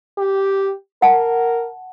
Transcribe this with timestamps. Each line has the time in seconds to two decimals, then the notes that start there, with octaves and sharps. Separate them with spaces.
0.18 G4
1.02 A#4 F#5 A5